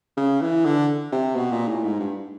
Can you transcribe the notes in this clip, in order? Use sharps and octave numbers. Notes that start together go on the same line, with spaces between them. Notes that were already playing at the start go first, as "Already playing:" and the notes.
C#3
E3
D3
C3
B2
A#2
A2
G#2
G2